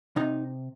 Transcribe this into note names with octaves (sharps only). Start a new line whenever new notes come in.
C3 D#4